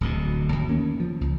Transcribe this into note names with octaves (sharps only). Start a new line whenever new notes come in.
D1 D2 B2
D#2
D#3 A#3 C#4
F3
C#2